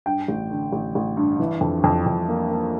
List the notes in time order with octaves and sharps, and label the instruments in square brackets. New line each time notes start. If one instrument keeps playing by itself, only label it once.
[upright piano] G2 G5
A1
D3
A1
A1
G2
E3
F2
F2
F2
A#3
A#3